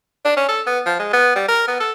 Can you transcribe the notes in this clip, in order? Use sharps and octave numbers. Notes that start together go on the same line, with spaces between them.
D4
C#4
A4
B3
F3
G#3
B3
G3
A#4
B3
A4